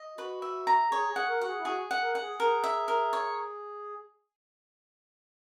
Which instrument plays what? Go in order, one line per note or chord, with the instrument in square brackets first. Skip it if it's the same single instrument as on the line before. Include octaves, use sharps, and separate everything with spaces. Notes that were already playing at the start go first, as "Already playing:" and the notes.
Already playing: [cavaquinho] D#5
[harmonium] F#4 [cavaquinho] B4
[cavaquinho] E5
A#5
[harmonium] G#4 [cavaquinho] C#5
[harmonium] G#4
[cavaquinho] F#5
[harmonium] A#4
[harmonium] F#4 [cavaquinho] F#5
[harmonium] G#4
E4
[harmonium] F#4 [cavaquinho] G#4
[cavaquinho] F#5
[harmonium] A#4
[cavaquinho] F#5
[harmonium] G#4
[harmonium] G#4 [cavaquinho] A#4
[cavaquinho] E5
A#4
C#5